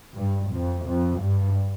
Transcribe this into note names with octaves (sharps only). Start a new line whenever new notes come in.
G2
F2
F2
G2